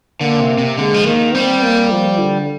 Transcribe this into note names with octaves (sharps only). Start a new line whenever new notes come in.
D3 A#3
C3
C3
D3 G#3
F3
D#3 A#3
G3 C4
A#3
F3
D3